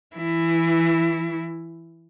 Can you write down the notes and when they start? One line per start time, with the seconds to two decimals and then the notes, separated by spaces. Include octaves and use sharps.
0.16 E3 E4